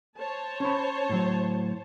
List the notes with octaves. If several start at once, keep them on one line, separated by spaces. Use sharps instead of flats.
C5 C#5 A5
C#4 B5
A2 F#3